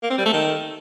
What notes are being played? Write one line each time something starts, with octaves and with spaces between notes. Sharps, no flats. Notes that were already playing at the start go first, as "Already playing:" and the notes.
A#3
C4
G3
A3
D#3